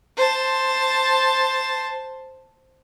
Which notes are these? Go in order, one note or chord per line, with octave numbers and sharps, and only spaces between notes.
C5 A5